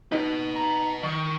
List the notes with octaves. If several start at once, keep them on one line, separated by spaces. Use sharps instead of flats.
D#4 B4 D#5
A#5
D#3 C#6